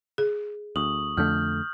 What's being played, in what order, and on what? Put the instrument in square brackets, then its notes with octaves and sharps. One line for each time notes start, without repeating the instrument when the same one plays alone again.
[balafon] G#4
[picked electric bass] D2 [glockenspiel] C#6 D#6 F#7
[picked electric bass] F2 D3 A3 [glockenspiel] F6 G6